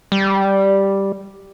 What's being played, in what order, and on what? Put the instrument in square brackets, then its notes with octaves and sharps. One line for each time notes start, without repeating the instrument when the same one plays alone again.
[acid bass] G3